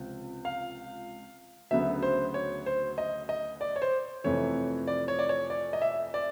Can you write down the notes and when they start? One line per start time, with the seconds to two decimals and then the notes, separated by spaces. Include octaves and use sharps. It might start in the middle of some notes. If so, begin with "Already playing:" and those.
Already playing: C#2 C3 F3
0.45 F5
1.71 D2 C#3 F#3 B3 E5
2.02 C5
2.34 C#5
2.66 C5
2.98 D#5
3.29 D#5
3.61 D5
3.76 C#5
3.82 C5
4.24 F2 C3 E3 A3 C#5
4.87 D5
5.08 C#5
5.19 D5
5.29 C#5
5.50 D5
5.73 D#5
5.82 E5
6.14 D5